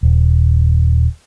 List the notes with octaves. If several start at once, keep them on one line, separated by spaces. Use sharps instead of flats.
D#1